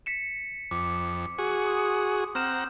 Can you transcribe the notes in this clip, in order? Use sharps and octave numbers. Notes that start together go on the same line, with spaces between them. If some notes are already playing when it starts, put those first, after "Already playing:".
B6 C#7 E7
F2 D6
F#4 G#4 C#6
C6 D#6
C4 F#5 A#5 F6 G6 E7